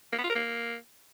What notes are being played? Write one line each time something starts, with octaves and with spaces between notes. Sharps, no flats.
A#3
B3
F4
A#4
A#3